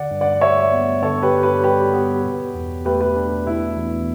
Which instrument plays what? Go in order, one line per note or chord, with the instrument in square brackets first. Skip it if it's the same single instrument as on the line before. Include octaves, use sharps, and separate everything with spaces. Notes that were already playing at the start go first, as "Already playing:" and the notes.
Already playing: [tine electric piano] D3 [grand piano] D5 F#5
[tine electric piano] G2
[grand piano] D5 F#5
[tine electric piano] G3 [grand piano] C#5 E5
[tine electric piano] B3
[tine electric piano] D3 [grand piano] A4 C#5
[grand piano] G4 B4
[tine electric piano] G2
[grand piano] G4 B4
[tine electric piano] G3 [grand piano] G4 B4
[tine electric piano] B3
B2
E2
[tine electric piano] A3 [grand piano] G4 B4
[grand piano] G4 B4
[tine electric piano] D4
[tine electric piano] B2 [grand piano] E4
[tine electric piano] E2